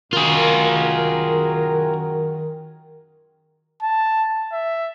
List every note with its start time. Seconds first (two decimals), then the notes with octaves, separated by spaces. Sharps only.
0.13 F#2 D#3 F4 F#4 G#4 A#4
3.83 A5
4.53 E5